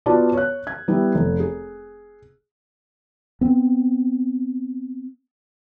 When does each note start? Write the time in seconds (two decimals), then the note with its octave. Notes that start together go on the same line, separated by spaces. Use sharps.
0.06 B3 F4 F#4 B4 D5 A5
0.33 C#5 F#6
0.67 G#6
0.88 G3 B3 E4
1.15 F1
1.40 G#4
3.41 B3 C4